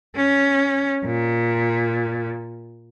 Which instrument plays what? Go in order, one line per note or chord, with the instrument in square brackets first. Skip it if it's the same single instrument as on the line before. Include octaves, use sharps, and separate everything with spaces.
[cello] C#4
A#2